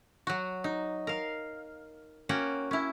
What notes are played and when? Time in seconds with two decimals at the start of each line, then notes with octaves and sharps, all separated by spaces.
0.27 F#3 F#4
0.64 D#4
1.07 A#4 F5
2.29 A#3 C#4 F#4 F#5 G5
2.71 C#4 E4